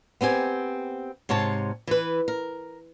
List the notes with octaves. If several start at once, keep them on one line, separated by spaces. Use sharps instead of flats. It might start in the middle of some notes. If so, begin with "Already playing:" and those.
B3 C4 G4 G#5
G#2 C3 C#5 A5
E3 B4
A#4